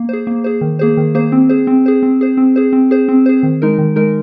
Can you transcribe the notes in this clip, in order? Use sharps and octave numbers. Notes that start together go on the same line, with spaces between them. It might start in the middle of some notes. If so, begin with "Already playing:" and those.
Already playing: A#3
G#4 C5
A#3
G#4 C5
D#3
A#3 G#4 C5
D#3
A#3 G#4 C5
C4
G#4 C5
C4
G#4 C5
C4
G#4 C5
C4
G#4 C5
C4
G#4 C5
C4
G#4 C5
D#3
G#3 D#4 A#4
D#3
G#3 D#4 A#4